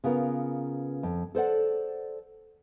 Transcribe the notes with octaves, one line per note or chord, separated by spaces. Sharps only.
C#3 B3 F4 A#4
F2
A4 C5 D5 F#5